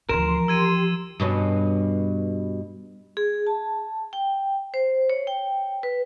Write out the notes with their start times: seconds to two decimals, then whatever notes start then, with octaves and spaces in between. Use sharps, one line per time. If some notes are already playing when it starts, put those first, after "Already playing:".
0.09 D2 E3 F3 A#4 C6 E7
0.48 G4 C6 E6 G#6 D#7
1.20 G2 B2 C#4
3.17 G#4
3.47 A5
4.13 G5
4.74 C5
5.10 C#5
5.27 G5
5.83 B4